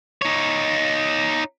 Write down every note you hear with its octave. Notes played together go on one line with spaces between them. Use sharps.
D#4 C#5